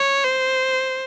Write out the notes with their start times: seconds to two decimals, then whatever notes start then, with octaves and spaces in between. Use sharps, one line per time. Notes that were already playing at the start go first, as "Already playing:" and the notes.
Already playing: C#5
0.25 C5